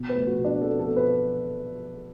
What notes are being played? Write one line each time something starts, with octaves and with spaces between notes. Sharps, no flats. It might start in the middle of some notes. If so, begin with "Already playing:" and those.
Already playing: B2
B4
A3
F#4
B2
D4
C4 A4
A4
B2
B4